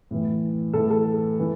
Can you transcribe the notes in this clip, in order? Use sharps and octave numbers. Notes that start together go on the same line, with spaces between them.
A2 E3
A2 E3 A4
A4
E3